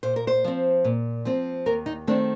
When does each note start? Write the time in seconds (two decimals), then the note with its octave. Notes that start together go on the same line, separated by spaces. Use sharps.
0.03 A#2 C5
0.16 A#4
0.27 C5
0.44 F3 C4
0.84 A#2
1.25 F3 C4
1.66 D#2 A#4
1.86 D#4
2.07 D#3 A3 C4 D4